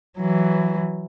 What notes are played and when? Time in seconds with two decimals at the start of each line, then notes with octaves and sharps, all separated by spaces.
0.18 E3 F#3